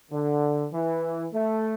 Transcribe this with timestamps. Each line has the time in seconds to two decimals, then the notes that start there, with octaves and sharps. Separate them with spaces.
0.11 D3
0.72 E3
1.33 A3